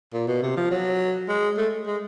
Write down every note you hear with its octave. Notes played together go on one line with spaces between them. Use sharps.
A#2
B2
C3
F3
F#3
G#3
A3
G#3